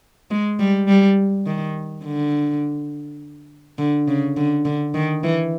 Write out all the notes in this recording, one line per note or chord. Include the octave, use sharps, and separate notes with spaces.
G#3
G3
G3
D#3
D3
D3
C#3
D3
D3
D#3
E3